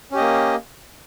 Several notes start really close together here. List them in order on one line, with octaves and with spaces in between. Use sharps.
C#4 G4 D#5 A#3